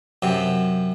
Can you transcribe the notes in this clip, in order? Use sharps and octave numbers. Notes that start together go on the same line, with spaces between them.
F#2 C3